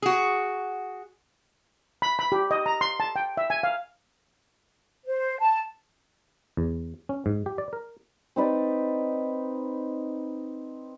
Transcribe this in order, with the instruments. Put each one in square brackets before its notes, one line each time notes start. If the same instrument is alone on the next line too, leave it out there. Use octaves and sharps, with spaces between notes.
[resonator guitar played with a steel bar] F#4 G#4
[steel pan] B5
B5
G4
D#5
A#5
C6
A5
G5
E5
G#5
F5
[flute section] C5
A5
[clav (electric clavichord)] E2
C#4
G#2
G4
D5
A#4
[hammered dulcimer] C4 D#4 B4 D5